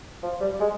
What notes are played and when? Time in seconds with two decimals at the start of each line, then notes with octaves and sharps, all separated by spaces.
0.23 F3
0.41 G3
0.60 G#3